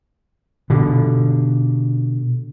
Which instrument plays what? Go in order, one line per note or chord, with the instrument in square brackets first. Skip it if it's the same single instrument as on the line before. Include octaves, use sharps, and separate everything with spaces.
[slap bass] B2 D3